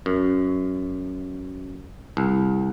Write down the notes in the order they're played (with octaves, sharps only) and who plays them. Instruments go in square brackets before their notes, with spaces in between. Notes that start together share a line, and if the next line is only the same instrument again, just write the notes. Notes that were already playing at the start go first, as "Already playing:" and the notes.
[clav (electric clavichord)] F#2
C2